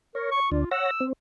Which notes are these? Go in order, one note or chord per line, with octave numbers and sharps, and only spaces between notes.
A#4 C#5
C#6
D2 D4 F4
C#5 F#5 E6 A#6
C4